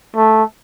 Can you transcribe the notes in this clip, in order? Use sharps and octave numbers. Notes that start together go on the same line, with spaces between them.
A3